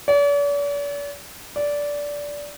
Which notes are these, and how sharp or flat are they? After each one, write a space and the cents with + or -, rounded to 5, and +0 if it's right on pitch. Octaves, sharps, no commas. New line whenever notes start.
D5 -45
D5 -15